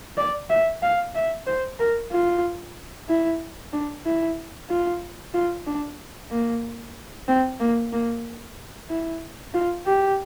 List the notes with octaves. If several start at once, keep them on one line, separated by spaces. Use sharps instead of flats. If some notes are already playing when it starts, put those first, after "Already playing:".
D5
E5
F5
E5
C5
A#4
F4
E4
D4
E4
F4
F4
D4
A#3
C4
A#3
A#3
E4
F4
G4